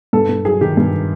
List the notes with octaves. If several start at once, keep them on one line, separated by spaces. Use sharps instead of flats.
G2 A4
G2
F#3 G#4
D#3 G4
G2